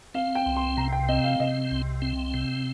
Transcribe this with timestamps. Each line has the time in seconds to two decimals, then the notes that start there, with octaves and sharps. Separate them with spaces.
0.15 C4 F5
0.35 G5
0.46 C2
0.57 C6
0.77 C3 A#5
0.92 G5
1.09 C4 D#5
1.24 F5
1.40 C3 D#5
1.71 C2
2.02 C4
2.34 C3